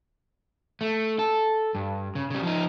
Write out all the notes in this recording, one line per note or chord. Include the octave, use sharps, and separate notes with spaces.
A3
A4
G2
C#3
C#3 G3
F3 D#4